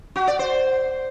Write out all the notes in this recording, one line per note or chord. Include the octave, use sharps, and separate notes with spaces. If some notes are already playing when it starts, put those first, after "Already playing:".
F#4
D5
C5